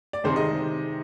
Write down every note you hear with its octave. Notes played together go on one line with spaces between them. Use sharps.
D5
C3 D#3 G#3 C4 G#4 C5
D#5